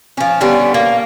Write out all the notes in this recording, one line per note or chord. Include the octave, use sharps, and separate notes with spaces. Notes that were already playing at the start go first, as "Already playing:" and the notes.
F3 C#4
D3 G3 B3 C#4
A#3